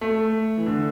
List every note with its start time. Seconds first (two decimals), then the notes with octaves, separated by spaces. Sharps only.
0.01 A3
0.57 E3
0.66 D3